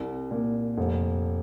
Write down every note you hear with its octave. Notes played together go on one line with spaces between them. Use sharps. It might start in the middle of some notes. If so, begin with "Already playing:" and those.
Already playing: C2
A#2
F1